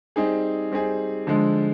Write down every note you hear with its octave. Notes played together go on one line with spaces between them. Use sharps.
G3 C4 D#4 G#4
G3 C4 D#4 G#4
D3 F3 G#3